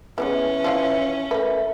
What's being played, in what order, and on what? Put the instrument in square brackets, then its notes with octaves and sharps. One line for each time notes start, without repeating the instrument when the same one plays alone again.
[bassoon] E3 [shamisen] G#3 A#3 B3 [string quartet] C#4
[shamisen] F3 E4 F5
[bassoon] A3 [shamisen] A#4 B4